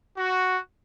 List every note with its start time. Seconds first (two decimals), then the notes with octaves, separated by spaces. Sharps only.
0.17 F#4